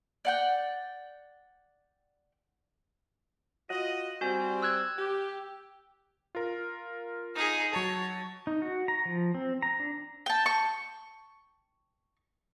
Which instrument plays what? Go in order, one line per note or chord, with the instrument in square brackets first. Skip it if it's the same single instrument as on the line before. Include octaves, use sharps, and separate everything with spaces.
[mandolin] D5 F#5 G5
[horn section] F4 F#4 D#5
[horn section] G3 C4 [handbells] F#4 G#5
[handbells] E6 F#6 G#6
[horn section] G4
[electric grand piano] F4 A#4
[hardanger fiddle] D#4 G#4
[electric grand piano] F#3 A5 [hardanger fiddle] C#5
[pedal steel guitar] D#4
F#4
A#5
F3
C4
A#5
D4
[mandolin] G5 A5
C#6